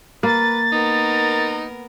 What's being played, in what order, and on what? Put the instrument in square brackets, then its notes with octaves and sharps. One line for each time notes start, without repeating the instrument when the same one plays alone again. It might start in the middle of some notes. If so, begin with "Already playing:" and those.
[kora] A#3 [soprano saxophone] B4 [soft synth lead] A6
[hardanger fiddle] B3 A#4 [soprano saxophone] D#4